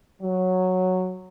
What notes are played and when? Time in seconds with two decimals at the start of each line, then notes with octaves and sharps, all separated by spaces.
0.22 F#3